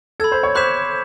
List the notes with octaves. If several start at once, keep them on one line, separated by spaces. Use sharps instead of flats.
A4 B5 E6 G#6
C5
C#5
C5 B5 D6 F#6 B6 E7